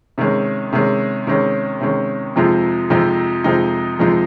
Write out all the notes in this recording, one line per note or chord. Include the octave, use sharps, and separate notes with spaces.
C3 D#3 G#3 C#4
C3 D#3 G#3 C#4
C3 D#3 G#3 C#4
C3 D#3 G#3 C#4
F2 C3 F3 G#3 D#4
F2 C3 F3 G#3 D#4
F2 C3 F3 G#3 D#4
F2 C3 F3 G#3 D#4